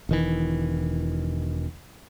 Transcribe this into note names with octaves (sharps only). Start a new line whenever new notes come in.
E1 D#3 E3